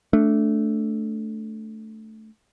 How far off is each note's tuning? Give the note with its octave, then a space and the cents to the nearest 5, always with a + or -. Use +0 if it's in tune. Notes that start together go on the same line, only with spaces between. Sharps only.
A3 -5 D4 -15